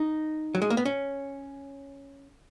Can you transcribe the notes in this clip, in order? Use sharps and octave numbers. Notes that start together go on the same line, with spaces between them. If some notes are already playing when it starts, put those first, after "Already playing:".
Already playing: D#4
F#3
G#3
A#3
B3
C#4